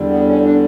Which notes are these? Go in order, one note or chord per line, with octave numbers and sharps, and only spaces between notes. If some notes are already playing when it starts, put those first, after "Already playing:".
Already playing: E2 D3 G3
B3
C#4
D4